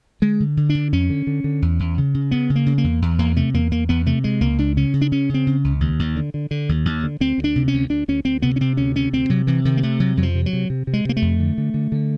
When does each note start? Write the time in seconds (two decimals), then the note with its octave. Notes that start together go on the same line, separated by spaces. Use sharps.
0.22 D3 G#3
0.40 D3
0.57 D3
0.69 D4
0.75 D3
0.92 F2 C#4
1.10 D3
1.27 D3
1.44 D3
1.62 E2
1.80 E2
1.98 C#3
2.14 C#3
2.31 C#3 B3
2.50 C#3
2.56 A#3
2.66 C#3
2.78 A#3
2.84 E2
3.02 E2
3.19 E2 A#3
3.36 C3 A3
3.54 E2 A#3
3.71 E2 A#3
3.89 E2 B3
4.06 C3 A3
4.24 C3 G#3
4.41 C#2 A#3
4.58 C#2 D4
4.77 C#3 C#4
4.93 C#3
5.01 D4
5.12 C#3 C#4
5.29 C#3 C4
5.47 C#3
5.64 C#2
5.80 D#2
5.99 D#2
6.16 D3
6.34 D3
6.51 D3
6.69 D#2
6.85 D#2
7.03 D3
7.20 D2 C4
7.38 D2
7.44 D4
7.56 C3
7.68 C#4
7.74 D2
7.90 D2 D4
8.08 D2 C#4
8.25 D2 C4
8.42 C3 B3
8.56 C#4
8.60 C3 C4
8.77 D2 C#4
8.95 C3 C#4
9.13 D2 C4
9.29 C3 F#3
9.47 C3 E3
9.65 C3 D#3
9.77 A#3
9.83 C3 A3
10.00 C3 F#3
10.17 F2 F#3
10.23 F3
10.35 C3
10.46 F#3
10.53 C3
10.70 C3
10.87 C3
10.93 G#3
11.05 C3 A#3
11.17 A3
11.22 F2
11.40 D3
11.58 D3
11.74 D3
11.92 D3